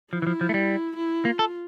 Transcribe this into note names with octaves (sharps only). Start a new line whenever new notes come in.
F3 E4
E3
F3
F3
A3
G3
E4
A#3 F4
A4